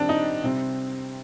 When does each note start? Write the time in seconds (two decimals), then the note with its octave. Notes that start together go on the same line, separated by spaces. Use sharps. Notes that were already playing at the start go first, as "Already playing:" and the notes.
Already playing: D#3 G3 C4 D4
0.09 D#4
0.43 C3 G3 C4